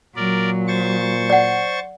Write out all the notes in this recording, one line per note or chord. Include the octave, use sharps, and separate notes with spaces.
A#2 F#3 A#4 D5
C5 C#6 A6
D5 F#5